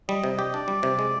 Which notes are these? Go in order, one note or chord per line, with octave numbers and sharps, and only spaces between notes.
G3 D#5
C3
D#5
G4
D4 D5
G3
C3
G#3